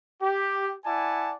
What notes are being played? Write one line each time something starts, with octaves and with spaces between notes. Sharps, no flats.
G4
E4 D5 F#5 G#5 A5